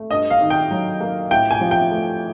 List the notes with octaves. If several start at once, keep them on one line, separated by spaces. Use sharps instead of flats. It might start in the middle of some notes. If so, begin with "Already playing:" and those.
Already playing: A3
G2 D#5
F5
D#3
G5
F#3
A#3
A2 G5
G#5
F3
G5
A3